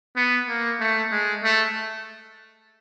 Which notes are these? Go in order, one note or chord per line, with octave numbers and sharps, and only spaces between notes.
B3
A#3
A3
G#3
A3